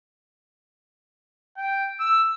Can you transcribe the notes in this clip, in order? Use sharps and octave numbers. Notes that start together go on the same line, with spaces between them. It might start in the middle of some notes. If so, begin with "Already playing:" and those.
G5
E6